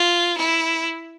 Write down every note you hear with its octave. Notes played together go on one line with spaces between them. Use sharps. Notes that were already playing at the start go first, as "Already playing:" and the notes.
Already playing: F4
E4